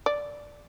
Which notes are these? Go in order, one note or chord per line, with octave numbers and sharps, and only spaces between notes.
D5